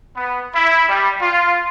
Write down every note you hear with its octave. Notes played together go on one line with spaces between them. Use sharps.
B3
E4
G3
F4